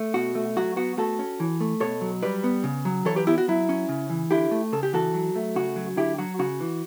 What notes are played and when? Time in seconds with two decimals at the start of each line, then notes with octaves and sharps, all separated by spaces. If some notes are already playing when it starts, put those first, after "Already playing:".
Already playing: A3
0.14 B2 F#4
0.35 A3
0.57 F#3 F#4
0.76 B3 F#4
0.98 A3 F#4 A4
1.19 C#4
1.40 E3
1.61 A3
1.80 B2 A4 C#5
2.01 F#3
2.23 G3 B4 D5
2.44 B3
2.64 C#3
2.85 F#3
3.05 E3 A4 C#5
3.16 G4 B4
3.27 B3 E4 G4
3.38 F#4
3.48 F#3 E4
3.69 C#4
3.89 C#3
4.10 E3
4.31 D3 E4 G4
4.51 A3
4.72 C#3 A4
4.83 G4
4.93 E3 F#4 A4
5.14 F#3
5.36 A3
5.56 C#3 F#4
5.76 F#3
5.97 D3 E4 G4
6.18 F#3 F#4
6.39 C#3 F#4
6.60 E3